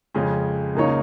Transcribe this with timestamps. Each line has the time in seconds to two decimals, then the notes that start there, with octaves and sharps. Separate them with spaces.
0.14 F2 C#3 G#3 C#4
0.75 C#2 C#3 A#3 D#4 C#5